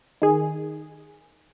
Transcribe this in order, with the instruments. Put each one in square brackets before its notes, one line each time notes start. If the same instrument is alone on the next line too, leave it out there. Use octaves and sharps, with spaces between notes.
[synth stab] D#3 G#4